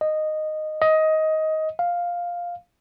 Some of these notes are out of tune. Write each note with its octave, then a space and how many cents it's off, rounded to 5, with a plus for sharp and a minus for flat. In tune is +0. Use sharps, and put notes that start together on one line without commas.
D#5 -10
D#5 +15
F5 +5